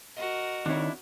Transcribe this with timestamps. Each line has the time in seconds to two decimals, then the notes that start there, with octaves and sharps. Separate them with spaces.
0.17 F#4 A#4 D#5
0.66 D#3 C4 D4 E4 C#5